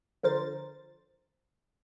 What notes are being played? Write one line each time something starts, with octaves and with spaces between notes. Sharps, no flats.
D3 F3 A#4 C5 A6